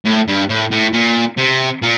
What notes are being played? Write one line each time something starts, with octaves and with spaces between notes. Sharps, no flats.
A2
G2
A2
A2
A#2
C3
A#2